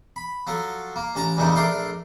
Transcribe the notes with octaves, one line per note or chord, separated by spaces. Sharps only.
B5
F3 F#3 A4
A#3
A1 C#4 A5 A#5
E2 G2 A#2 C#3 A3 D#4
A#1 A3 D4 A#4 C6